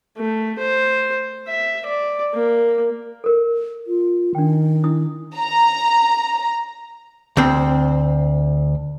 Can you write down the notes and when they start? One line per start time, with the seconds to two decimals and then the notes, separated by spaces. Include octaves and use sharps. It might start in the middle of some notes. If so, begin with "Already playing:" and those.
0.17 A3
0.58 C5
1.48 E5
1.86 D5
2.34 A#3
3.24 A4 A#4
3.87 F4
4.35 D#3 D4 G5
4.84 D4 E4 D#6
5.35 A#5
7.37 D2 C4